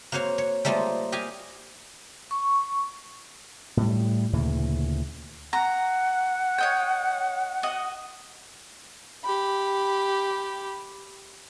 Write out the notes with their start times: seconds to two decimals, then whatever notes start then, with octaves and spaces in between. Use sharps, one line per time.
0.12 A#3 F#4 C5 C#5 F5
0.38 C#5
0.65 G3 A3 A#3 F4 C5 D#5
1.12 G4 D#5 F5 G#5
2.31 C#6
3.77 A2 G3
4.33 D2 A#2 C#3 E3
5.53 F#5 A#5
6.58 C#5 D#5 G5
7.63 F#4 D#5
9.24 G4 B5